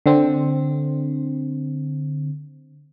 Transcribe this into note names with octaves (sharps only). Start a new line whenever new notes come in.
D3 C4